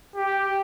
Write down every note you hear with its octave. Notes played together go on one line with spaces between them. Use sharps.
G4